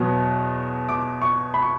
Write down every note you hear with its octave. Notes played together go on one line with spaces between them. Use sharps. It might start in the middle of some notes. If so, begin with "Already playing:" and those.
Already playing: E2 B2 F#3 B3
D6
C#6
B5
C#6